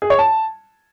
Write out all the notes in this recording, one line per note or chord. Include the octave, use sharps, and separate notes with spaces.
G#4
C#5
A5